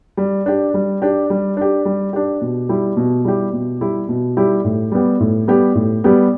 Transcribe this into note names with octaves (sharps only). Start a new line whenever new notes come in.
G3
D4 G4
G3
D4 G4
G3
D4 G4
G3
D4 G4
B2
G3 E4 G4
B2
G3 E4 G4
B2
G3 E4 G4
B2
G3 E4 G4
A2
G3 B3 G4
A2
G3 B3 G4
A2
G3 B3 G4